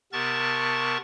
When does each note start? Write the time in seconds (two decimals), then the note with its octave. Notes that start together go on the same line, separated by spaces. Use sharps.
0.13 C3 B3 A#4 A5 C#6 A6